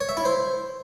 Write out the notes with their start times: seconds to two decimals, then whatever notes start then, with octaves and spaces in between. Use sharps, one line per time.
0.01 C#5
0.09 E5
0.17 E4
0.25 C5